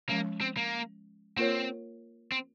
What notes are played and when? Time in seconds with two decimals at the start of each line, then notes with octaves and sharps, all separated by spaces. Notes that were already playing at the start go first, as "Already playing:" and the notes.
0.09 F3 G#3 A#3 C#4
0.41 C4
0.57 A#3
1.37 A#3 C4 F4 A#4 C#5
2.32 C4